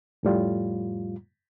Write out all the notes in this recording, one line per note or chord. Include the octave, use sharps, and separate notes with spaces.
F2 A2 G3 F4